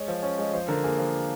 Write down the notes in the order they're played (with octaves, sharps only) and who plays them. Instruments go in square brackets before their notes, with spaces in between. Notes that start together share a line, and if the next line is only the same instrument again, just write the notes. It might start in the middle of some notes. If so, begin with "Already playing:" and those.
Already playing: [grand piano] G#3 C#5
F3
C#4
G#3
F3 C5
D3 A#4
A#3 G#4
F3